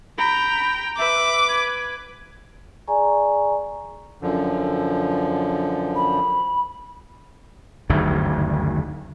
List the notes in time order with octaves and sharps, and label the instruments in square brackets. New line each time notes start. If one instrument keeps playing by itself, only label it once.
[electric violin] G5 A#5 [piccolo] B5
[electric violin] B4 [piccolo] E5 [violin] D6
[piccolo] G#6
[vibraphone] G#4 D5 G#5 A#5 C#6
[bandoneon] F#2 D3 F3
[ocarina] B5
[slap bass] F#1 D2 G2 D#3